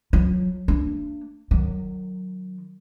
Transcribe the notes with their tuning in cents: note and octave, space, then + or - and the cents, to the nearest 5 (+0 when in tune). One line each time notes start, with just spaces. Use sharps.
F#3 -25 F4 +15
A3 +45 D4 -5
D#3 -30 F#3 +0